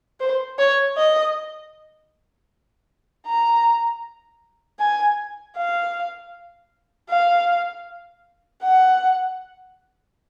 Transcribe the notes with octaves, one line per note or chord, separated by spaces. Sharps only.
C5
C#5
D#5
A#5
G#5
F5
F5
F#5